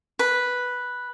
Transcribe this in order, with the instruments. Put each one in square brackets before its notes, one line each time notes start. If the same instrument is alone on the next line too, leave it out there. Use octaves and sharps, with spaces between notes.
[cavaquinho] B4